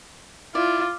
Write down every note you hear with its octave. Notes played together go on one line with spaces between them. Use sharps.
E4 F4 D5